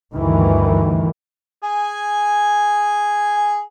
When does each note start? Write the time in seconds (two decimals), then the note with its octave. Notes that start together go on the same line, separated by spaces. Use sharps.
0.13 D2 G2 D#3 E3
1.63 G#4 G#5